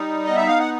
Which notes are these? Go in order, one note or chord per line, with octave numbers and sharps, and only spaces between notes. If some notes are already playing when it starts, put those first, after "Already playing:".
Already playing: G3 D#4
B3 D#5
E5
F5
F#5